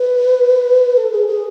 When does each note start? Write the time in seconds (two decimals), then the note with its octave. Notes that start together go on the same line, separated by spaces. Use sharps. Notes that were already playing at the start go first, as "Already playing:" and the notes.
Already playing: B4
0.97 A4
1.12 G#4
1.28 G#4